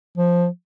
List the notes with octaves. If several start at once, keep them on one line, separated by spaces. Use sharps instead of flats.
F3